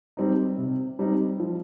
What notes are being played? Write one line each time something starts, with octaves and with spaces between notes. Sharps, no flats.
G3 C4 D#4
C3
G3 C4 D#4
F3